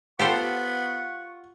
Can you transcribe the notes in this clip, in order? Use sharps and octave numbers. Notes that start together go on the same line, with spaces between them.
B3 F4 G4 A4 C5 F#5 C#6